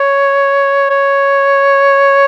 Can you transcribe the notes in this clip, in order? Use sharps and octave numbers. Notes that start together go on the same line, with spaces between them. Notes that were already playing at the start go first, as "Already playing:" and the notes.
Already playing: C#5
C#5